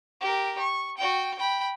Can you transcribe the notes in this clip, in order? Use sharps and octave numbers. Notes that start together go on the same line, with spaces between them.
G4 A#4
C#6
F#4 G5
G5 B5